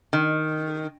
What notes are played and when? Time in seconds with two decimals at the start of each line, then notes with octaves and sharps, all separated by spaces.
0.13 D#3